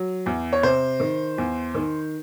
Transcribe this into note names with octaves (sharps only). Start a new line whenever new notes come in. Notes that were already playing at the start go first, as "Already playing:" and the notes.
Already playing: F#3
E2
C#5
C3 C5
D#3
E2
D#3